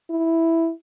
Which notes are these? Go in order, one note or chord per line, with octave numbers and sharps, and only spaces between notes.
E4